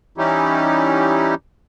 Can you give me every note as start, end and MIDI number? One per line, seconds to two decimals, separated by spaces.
0.18 1.35 52
0.18 1.35 55
0.18 1.35 61
0.18 1.35 63
0.18 1.35 64
0.18 1.35 67